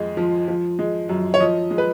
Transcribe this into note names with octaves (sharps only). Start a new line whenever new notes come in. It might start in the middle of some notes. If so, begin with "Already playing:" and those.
Already playing: F2 G#3
F3
F3
G#3
F#2
C#5
F3 D#5
G#3
B4